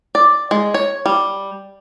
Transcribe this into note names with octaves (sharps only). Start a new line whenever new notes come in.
D5
G#3
C#5
G3